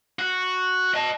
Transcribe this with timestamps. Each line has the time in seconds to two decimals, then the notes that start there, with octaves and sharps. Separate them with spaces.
0.19 F#4
0.94 D#5 A5